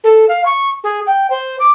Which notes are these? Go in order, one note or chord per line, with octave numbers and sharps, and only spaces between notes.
A4
F5
C#6
G#4
G5
C5
D6